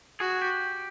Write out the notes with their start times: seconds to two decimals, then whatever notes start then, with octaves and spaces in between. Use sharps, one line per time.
0.20 F#4 G#4
0.42 G4